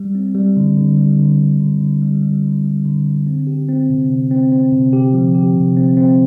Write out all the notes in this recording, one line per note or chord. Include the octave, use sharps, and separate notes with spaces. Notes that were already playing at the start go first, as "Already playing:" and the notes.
Already playing: G3
C4
G3
D3
D3
G3
D3
D3
D3
D3
G3
G3
D3
G3
D3
D3
C4
G4
C4
C3
C4
C4
C4
C3
G4
F3
G4
C3
C4
C4